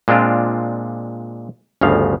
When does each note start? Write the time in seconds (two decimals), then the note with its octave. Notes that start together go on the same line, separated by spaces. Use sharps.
0.08 A#2 G#3 C4 D4 F4
1.81 G1 D2 C#3 F3 F5